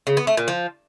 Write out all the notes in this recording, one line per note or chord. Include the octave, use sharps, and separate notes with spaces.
C#3
B3
A3
A#2
F3